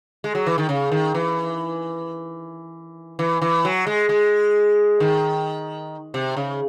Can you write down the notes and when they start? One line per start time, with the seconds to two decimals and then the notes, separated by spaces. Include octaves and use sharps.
0.24 G#3
0.35 F#3
0.47 E3
0.58 D#3
0.69 C#3
0.92 D#3
1.14 E3
3.19 E3
3.42 E3
3.65 F#3
3.87 G#3
4.09 G#3
5.00 D#3
6.14 C3
6.37 C#3